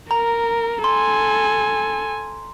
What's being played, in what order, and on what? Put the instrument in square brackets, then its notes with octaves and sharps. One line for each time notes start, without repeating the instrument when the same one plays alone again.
[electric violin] A#4 [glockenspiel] A#5
[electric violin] A4 G#5 [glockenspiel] C6